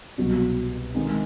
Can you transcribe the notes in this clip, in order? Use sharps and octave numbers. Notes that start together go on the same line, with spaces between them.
C2 B2 F#3
D#3 G#3 C4 D#4